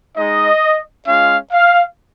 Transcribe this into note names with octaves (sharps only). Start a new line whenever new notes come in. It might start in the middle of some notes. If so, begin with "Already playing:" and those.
G#3 D#4 D#5
G#3 C#4 F4 F5
F5